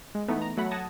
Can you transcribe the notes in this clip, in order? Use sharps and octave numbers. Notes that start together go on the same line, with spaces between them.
G#3
E3 A3 B3 D#4
A#5
F#3 A3 F#5 B5
F#5 A5 D#6 G#6 A#6